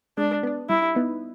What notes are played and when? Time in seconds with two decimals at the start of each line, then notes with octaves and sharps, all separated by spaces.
0.17 G#3 D4
0.43 B3 D4
0.69 G3 E4
0.95 B3 D#4